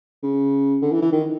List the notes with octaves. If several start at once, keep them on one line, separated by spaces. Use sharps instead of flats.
C#3
D3
E3
E3
D#3